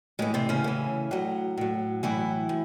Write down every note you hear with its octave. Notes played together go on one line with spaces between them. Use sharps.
A2 E3 G#3
C3 C4
C#3 C#4
A2 E3
A2 F#3
A2 F#3
A2 E3 F#3 E4
A2